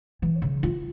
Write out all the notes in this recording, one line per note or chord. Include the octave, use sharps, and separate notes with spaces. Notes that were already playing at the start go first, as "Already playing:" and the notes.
E3
C#3
F4